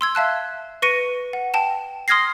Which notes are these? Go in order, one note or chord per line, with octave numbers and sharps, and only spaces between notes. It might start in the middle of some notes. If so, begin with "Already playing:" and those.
C6 E6 G#6
E5 F5 A5 F#6
B4 C#6 A#6 C#7 D#7
F#5
G5 A5 E7
C6 D#6 F6 G#6 A#6 C7